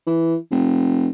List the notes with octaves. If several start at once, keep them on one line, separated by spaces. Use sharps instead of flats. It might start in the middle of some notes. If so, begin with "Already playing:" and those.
E3
F1